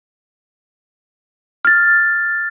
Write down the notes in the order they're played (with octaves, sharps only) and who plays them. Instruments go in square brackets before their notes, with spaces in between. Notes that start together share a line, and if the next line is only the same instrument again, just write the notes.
[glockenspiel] F6 A6